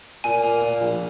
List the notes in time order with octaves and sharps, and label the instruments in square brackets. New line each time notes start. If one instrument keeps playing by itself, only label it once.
[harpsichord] A#2 [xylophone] G#5
[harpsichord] A#3
A#2
A#1